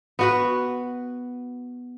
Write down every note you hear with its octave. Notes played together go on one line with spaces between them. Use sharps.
B3 F#4 B4